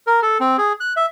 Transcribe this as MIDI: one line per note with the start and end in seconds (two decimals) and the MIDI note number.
0.07 0.20 70
0.23 0.38 69
0.40 0.57 60
0.58 0.73 68
0.80 0.93 90
0.96 1.06 76